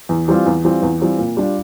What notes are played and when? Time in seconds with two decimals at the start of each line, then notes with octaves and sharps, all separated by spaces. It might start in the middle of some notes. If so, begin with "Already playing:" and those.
0.09 E2
0.28 E3 G3 C4 F4
0.46 E2
0.65 E3 G3 C4 F4
0.82 E2
1.01 E3 G3 C4 F4
1.19 A#2
1.37 G3 D4 F4